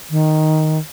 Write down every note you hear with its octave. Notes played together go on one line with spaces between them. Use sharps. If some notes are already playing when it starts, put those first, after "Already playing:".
D#3